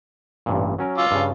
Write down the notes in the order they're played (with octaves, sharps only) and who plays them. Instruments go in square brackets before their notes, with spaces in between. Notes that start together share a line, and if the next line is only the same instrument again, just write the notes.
[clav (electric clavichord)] A1 G2 A#2
F#3 C#4 A#4
[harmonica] F4 D6 E6
[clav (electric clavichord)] G2 C#3